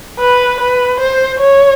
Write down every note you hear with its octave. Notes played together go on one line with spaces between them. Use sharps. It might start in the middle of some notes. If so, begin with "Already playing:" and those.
B4
B4
C5
C#5